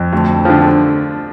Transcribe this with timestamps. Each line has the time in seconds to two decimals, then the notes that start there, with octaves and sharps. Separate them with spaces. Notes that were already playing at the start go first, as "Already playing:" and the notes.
Already playing: F2
0.13 D2
0.45 D3 F3